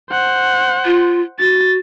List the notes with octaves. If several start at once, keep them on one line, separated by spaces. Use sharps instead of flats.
C5 F#5
F4
F#4 A6